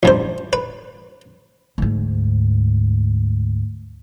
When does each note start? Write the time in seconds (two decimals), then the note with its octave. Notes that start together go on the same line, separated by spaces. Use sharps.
0.03 A1 G2 C5
0.53 B4
1.78 D2 G#2